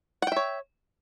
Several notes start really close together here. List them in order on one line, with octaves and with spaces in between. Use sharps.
F#5 G5 E5 C#5